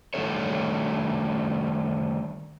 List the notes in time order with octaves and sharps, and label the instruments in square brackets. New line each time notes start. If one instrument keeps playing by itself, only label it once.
[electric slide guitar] D#3 G3 A3 D4 A4 C#5